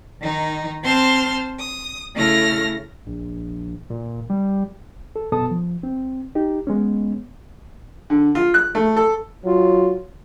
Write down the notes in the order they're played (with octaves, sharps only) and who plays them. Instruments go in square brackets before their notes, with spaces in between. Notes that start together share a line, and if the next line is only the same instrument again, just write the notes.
[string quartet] D#3 D#4
C4 C5 A5 C6 F6
D#6
C#3 A3 E4 A4 F6 A#6
[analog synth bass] A#1
A#2
G3
[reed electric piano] A4
F#2 B2 B3 A4 A5 D#6
F3
C4
D#4 G4
G#3 B3 C#4
[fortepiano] D3
F4
F#6
A3
A4
[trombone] F#3 [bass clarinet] F4